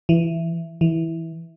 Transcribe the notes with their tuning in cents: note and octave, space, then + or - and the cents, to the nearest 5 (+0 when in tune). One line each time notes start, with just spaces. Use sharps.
E3 +10
E3 -10